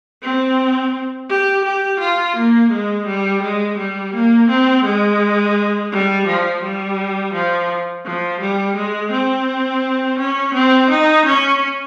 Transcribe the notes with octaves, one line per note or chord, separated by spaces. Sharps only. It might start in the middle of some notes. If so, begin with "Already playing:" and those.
C4
G4
G4
F4
A#3
G#3
G3
G#3
G3
A#3
C4
G#3
G3
F3
G3
F3
F3
G3
G#3
C4
C#4
C4
D#4
C#4